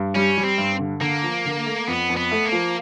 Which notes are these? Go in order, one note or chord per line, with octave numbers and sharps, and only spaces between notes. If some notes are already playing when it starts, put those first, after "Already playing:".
Already playing: G2
G3 C#4
G3
C4
G2
D3
D3 A#3
F3
D3
A3
F2 B3
F2
B3
A3
A#3
F3